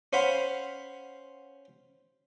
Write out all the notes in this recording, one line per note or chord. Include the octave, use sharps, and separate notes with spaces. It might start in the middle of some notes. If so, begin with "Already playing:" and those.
C#4 C5 F5 F#5 B5